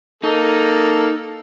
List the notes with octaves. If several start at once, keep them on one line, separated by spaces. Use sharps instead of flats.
A#3 D#4 A4